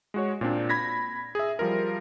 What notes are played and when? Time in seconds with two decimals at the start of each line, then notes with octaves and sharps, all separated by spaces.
0.14 G#3 F#4 C#5
0.41 A#2 C4 D4
0.69 B5 G#6 A#6 B6
1.35 G#4 E5
1.59 F3 G3 F4 A#4